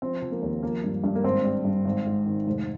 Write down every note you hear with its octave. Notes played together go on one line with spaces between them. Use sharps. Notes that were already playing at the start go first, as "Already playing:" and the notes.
F3 C4
F3
A#3
D#2
F3 A#3
G2
G2
A#3
G#1 C4
G3
G2
G#1
G#2
D#3
F1